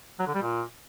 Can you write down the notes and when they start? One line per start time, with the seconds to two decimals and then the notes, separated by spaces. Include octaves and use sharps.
0.19 F#3
0.27 D3
0.34 G3
0.42 A#2